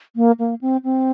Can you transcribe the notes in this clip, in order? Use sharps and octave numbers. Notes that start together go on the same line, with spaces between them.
A#3
A#3
C4
C4